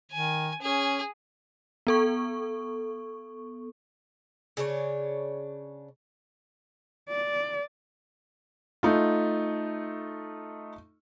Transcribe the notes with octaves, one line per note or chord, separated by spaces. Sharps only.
D#3 G#5
C#4 G#4
B3 A4 C#6
C#3 D4 A4 C#5
D5
A3 D#4 F4